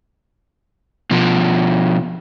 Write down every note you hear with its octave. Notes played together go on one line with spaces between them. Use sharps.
B2 F3